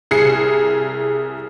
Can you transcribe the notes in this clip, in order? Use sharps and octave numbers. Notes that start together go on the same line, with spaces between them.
C2 G#4 C7 C#7